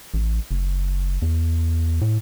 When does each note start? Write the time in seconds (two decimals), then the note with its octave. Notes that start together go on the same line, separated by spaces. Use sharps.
0.14 A1
0.51 F#1
1.22 E2
2.01 A2